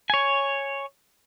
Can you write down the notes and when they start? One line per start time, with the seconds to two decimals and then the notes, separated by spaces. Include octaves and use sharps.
0.10 C#5 G#5